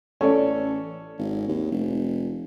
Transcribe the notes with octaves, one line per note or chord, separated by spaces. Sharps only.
A1 C#4 A4 D5
G#1
D#2
F1